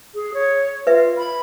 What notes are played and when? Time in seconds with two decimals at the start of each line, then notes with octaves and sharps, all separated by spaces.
0.15 G#4
0.34 C#5
0.87 F4 B4 E5
1.18 B5